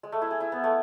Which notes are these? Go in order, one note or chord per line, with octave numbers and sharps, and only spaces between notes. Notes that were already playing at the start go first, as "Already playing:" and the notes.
G#3
A3
E4
G#4
E4
B3
A3